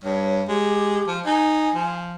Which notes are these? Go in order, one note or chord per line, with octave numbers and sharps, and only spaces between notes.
G2 C#5
G#3 G4
F3
D#4 G#5
F3